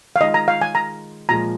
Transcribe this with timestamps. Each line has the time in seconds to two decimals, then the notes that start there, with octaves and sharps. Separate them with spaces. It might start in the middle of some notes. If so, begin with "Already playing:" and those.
0.16 F5
0.21 D#3 G#3 F4 D#5
0.34 A#5
0.48 F5
0.61 G#5
0.75 A#5
1.29 A#2 F3 G#3 A#5